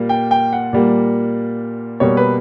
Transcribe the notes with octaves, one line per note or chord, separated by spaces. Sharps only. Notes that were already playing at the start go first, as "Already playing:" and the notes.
Already playing: A#2 G3 A#3
G5
G5
F#5
A#2 G3 A#3
B2 G3 A#3 C#5
B4